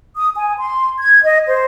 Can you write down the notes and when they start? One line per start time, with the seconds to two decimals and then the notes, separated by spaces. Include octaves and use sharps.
0.16 D#6
0.36 G#5
0.57 C6
0.99 G#6
1.24 D#5
1.47 C5